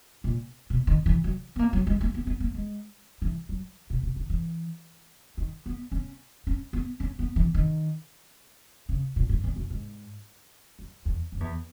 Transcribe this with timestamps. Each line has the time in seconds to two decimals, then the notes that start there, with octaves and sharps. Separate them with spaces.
0.24 A#2
0.70 B2
0.87 D#3
1.06 E3
1.24 F#3
1.56 B3
1.59 A#3
1.73 F#3
1.87 G#3
2.01 A#3
2.14 B3
2.27 B3
2.40 A#3
2.54 G#3
3.22 E3
3.49 F#3
3.90 B2
4.03 B2
4.16 D#3
4.30 E3
5.37 D#3
5.66 B3
5.92 C#4
6.47 C#4
6.73 B3
7.00 C#4
7.19 B3
7.36 E3
7.54 D#3
8.89 C#3
9.16 A#2
9.29 G#2
9.44 E2
9.56 F#2
9.70 G#2
10.79 F#2
11.05 E2
11.32 F#2
11.40 E2